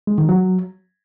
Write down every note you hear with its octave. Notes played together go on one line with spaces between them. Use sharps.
G#3
D#3
F#3